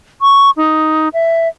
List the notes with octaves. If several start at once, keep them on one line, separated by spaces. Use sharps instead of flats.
C#6
D#4
E5